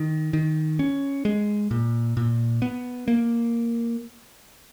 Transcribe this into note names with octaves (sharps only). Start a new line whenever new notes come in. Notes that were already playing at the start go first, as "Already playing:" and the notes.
Already playing: D#3
D#3
C#4
G#3
A#2
A#2
B3
A#3